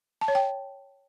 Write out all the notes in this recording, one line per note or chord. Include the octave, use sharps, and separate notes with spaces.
A5
C#5
G5